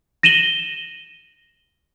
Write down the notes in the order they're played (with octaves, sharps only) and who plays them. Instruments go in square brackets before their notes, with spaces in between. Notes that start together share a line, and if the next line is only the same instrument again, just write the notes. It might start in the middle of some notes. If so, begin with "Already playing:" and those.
[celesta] A#6 D#7 E7 F#7 G7